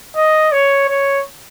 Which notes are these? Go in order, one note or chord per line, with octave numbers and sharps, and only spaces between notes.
D#5
C#5
C#5